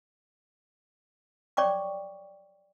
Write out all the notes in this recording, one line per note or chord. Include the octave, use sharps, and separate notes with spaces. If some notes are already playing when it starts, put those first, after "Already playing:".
C#5 D5 G5 C#6 D6